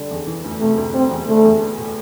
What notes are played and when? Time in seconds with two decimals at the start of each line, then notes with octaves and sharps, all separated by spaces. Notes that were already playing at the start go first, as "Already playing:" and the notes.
Already playing: D3 G3 D4
0.11 E2
0.27 E3
0.44 D2
0.60 C3 A3
0.78 D2
0.94 G3 C4
1.11 E2
1.28 D3 A3
1.45 E2
1.61 B3
1.78 A2